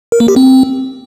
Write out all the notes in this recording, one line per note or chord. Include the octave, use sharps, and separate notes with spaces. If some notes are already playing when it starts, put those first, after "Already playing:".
A#4
A#3
G4
C4